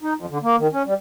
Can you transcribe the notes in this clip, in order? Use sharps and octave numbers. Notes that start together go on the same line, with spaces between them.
D#4
F2
D3
A#3
D#3
C#4
G3